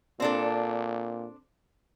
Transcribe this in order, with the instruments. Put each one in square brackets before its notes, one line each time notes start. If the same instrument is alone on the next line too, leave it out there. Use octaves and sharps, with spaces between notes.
[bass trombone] A#2 [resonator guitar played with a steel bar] C4 D4 A4